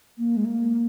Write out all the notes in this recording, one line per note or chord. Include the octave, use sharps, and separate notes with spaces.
A#3
G#3
A#3